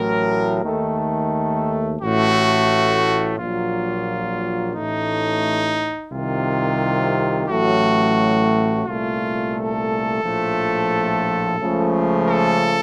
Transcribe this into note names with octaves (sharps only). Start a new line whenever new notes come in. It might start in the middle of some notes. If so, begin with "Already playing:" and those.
Already playing: A1 A2 F#3 A3 A#4
D#2 D#3 A3 A4
A1 A2 A3 F#4
A#1 A#2 F#3 F4
A1 A2 A3 D#4
C2 C3 D#3 F4
A1 A2 F#3 A3 F#4
C2 A#2 A3 F4
A4
A#1 A2 F3 A3
C#2 C#3 F3 A3
A4